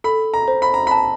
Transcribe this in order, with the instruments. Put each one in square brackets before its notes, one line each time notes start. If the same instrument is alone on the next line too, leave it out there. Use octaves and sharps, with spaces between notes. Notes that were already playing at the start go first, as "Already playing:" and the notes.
[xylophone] A4 [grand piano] B5
[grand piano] A#5
[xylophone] C5
[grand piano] B5
A#5
[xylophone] A5 [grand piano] B5